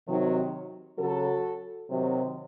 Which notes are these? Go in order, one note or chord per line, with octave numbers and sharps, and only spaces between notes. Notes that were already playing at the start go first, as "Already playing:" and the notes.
C3 D#3 F#3
C#3 F#3 F#4 A4
C3 D#3 F#3